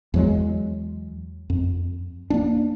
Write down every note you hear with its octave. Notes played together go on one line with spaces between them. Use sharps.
E2 F#3 G#3
F2
A#3 B3 D4